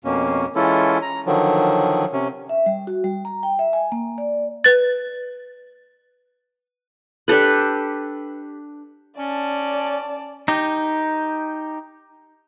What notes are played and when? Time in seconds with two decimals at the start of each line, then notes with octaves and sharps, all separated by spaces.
0.05 F2 B2 A#3 C#4
0.55 E3 G#3 C#4 E4 F4 A4
1.02 A#5
1.26 D3 D#3 F3 F#3
2.13 C3 C#4
2.49 E5
2.66 G3
2.87 F#4
3.04 G3
3.25 A#5
3.43 G5
3.59 E5
3.73 G#5
3.92 A#3
4.18 D5
4.64 B4 A6
7.28 D4 G4 A4 B4
9.19 C#4 D5 A5
10.48 D#4 G4